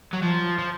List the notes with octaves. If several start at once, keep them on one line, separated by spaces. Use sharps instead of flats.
F#3
F3
F3